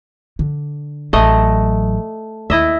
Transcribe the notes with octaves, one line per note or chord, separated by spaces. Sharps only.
D3
A1 F#3 A3 D#5
D#2 E4 D#5 E5